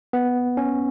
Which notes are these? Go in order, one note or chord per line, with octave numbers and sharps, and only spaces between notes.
B3
C#4